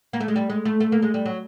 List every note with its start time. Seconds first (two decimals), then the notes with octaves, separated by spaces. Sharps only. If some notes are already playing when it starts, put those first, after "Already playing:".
0.13 A#3
0.21 A3
0.28 G#3
0.36 G3
0.50 G#3
0.65 A3
0.80 A3
0.92 A#3
1.02 G#3
1.14 G3
1.26 F#3